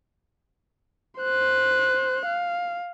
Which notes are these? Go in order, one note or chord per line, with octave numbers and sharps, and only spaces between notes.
C5 F#6
F5